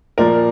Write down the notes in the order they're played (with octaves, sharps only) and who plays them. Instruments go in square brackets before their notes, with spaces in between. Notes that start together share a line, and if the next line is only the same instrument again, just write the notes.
[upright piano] A#2 F3 A#4 D5